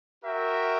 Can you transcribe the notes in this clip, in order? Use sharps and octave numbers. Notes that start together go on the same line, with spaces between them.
F#4 A#4 E5 G5